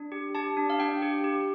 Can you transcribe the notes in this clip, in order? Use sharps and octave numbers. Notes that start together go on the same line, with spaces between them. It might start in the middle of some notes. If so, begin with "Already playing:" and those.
Already playing: D4
G4
G4 A5
D4
F5
D4 G5
G4
G4